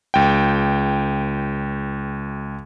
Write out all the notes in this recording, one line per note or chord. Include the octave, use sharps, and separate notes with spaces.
C#2 G5